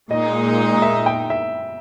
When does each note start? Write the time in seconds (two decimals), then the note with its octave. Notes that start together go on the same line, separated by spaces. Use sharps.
0.10 A#2 G#3 D#4 D#5
0.82 E5
1.06 G5
1.30 E5